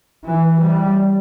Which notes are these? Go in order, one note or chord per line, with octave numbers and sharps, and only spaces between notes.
E3
G3